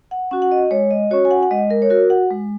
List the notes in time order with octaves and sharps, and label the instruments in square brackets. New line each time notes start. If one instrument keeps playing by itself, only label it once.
[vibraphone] F#5
C#4 F#4 F#5
F#5
D#5
G#3 C#5
D#5
C#4 F#4 C#5
G#5
F#5
F#5
G#3 D#5
A#4
C#5
F#4 A#4
F#5
G#3